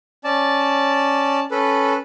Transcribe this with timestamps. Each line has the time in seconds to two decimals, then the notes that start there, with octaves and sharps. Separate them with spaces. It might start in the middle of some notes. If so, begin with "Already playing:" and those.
0.24 C#4 D5 A5
1.51 C#4 A4 B4